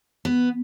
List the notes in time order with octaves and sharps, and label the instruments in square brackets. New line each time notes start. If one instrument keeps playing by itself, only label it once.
[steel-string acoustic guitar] B3